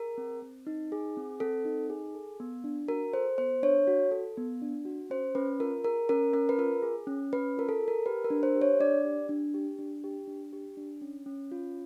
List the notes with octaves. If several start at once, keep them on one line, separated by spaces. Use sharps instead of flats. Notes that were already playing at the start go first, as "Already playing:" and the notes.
Already playing: G#4 A#4
C4
C4
D#4
G#4
C4
C4 A4
D#4
G#4
A4
B3
D4
F#4 A#4
A4 C5
B3 C5
D4 C#5
F#4
A4
B3
D4
F#4
C#4 C5
C#4 B4
F4 A#4
G#4 A#4
C#4 A#4
C#4 A#4
B4
F4 A#4
G#4
C#4
C#4 B4
F4 A#4
A4
G#4
A#4
G4 B4
A#4
D4
C5
G4
C#5
D4 D5
G4
D4
G4
D4
G4
D4
G4
D4
C#4
C#4
F4